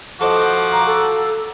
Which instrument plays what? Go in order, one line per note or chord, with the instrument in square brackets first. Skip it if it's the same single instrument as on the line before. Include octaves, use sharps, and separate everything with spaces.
[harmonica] F3 F#4 D6 [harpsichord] A4 C5 D#5
[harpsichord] F5 [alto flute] A#5
[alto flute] A4